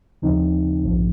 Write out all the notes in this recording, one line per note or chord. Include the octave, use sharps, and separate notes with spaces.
D#2 C#3 F3 C4 D#4
A#1 G#2 F3